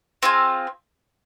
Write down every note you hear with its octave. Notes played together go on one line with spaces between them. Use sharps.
C4 F4 G#4